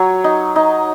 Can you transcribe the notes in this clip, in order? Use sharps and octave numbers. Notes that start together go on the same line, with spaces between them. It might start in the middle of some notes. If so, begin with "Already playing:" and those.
Already playing: F#3 C#5
D#4
D#4